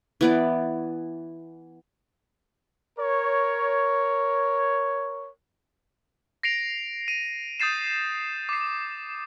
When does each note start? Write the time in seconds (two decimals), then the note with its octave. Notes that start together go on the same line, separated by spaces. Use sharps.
0.21 E3 B3 D5
2.99 A#4 C#5
6.43 A#6 C7 D7 F7
7.08 D#7
7.60 D#6 G6 A6 C7 E7
8.49 D6 C7